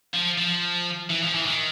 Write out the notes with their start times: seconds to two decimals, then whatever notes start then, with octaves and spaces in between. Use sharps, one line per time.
0.14 F3
0.38 F3
1.10 E3
1.23 F3
1.35 E3
1.46 D#3